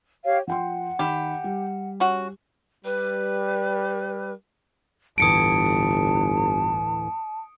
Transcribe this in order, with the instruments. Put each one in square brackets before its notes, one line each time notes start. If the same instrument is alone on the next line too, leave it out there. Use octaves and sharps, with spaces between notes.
[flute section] G4 C#5 F5
[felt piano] F3 G5 C6 [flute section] F#5
[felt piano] D#3 B5 E7 [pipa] G4
[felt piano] G3
[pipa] C#4 F#4
[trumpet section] G3 [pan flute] B4
[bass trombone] G1 [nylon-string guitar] D2 A2 E3 [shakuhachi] A5 [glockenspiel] D#6 C#7 D7